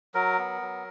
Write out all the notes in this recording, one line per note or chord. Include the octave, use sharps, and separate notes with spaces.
F#3 A#4
B3
F#3